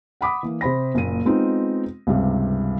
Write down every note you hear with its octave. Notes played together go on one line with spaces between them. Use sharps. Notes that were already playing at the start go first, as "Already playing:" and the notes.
F#5 B5 D6 D#6
E3 A#3
C3 C5 B5 A#6
F#1 A#2 D#7
G#3 B3 C4 D#4 F4
C#2 G2 C3